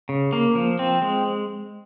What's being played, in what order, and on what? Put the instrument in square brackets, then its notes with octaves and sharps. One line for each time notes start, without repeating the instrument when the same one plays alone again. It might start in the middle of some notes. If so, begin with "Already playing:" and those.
[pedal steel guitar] C#3
A#3
F3
C4
G#3